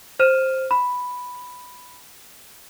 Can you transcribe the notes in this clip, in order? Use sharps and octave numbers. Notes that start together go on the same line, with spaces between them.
C5 F6 D#7 E7
B5